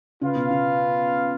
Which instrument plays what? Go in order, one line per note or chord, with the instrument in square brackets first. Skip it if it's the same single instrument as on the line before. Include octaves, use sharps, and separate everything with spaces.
[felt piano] C#3 [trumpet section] F4 B4 F5
[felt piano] B2
C#3